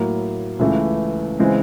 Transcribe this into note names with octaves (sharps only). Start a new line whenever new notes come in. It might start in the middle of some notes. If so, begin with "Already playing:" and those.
Already playing: A2 F#3 A#3
C#2 C#3 E3 A3
C#3 E3 G#3 C4